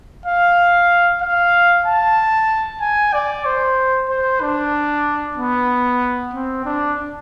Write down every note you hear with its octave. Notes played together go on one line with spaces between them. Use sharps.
F5
F5
A5
G#5
D5
C5
C5
D4
B3
C4
D4